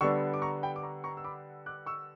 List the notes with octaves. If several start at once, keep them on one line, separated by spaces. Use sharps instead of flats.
D3 G3 B3 D4 C#6 E6
D6
A#5 C#6
G5 B5
D6
A#5 C#6
A#5 C#6
E6
B5 D6
D6 F#6
C#6 E6